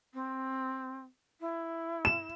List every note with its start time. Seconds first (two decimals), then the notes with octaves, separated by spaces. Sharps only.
0.14 C4
1.40 E4
2.05 E7